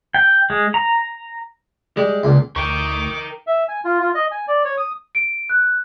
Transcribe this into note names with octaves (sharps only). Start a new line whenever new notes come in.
G5
G#3
A#5
G3 G#3
C#2 A#2
D2 A#4 G5 C#6 D6
E5
G#5
F4
F4
D#5
G#5
D5
C#5
D#6
D7
F#6